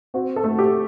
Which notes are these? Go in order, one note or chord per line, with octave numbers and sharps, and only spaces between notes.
C4 F#4
A4
A3
G4